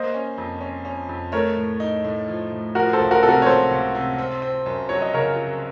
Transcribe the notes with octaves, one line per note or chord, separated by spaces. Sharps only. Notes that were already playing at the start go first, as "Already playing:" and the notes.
Already playing: A#3 C5 D#5
C#4
F2
C#4
C#4
F2
A3 A#4 C#5
A2
D#4
A2
F3
A2
F3 F#4 A#4
A4 C5
C#2
F#4 A#4
C3 A4
F#4 A#4
C#5
C#2 A4 C5
C#2
C3
C4
C4
F#2
F#3 C#5
D#5
C#3 A#4 C#5
F#3